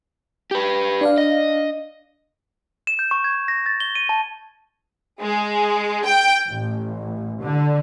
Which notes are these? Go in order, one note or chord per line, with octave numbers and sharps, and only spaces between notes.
G4 B4
D4 D5 F5
D#5
E7
G6
C#6
G#6
A#6
A6
G7
D#7
A5
G#3
G5
A1
D3